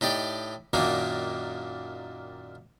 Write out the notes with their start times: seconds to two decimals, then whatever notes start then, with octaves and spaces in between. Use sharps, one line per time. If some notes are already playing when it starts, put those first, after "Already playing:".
0.01 A2 D#4 G4 D5
0.73 F#2 A#2 D#3 A#3 D4